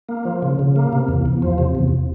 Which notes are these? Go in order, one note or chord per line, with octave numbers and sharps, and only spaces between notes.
A#3
F3
C#3
C#3
A#3
C3
E2
E2
F3
C3
E2